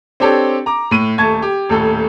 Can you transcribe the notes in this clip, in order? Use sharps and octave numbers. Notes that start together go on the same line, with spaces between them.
C4 D4 G4 A4 C#5
A#5 D6
A2 D#7
D#1 A3 A5 C#6 G#6
G4
D#1 A2 A4